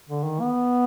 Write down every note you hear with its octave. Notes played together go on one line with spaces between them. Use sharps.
D3
D#3
B3